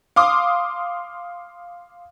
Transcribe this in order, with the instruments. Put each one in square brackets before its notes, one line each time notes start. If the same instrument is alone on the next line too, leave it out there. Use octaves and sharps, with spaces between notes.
[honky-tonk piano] F5 C6 D6 D#6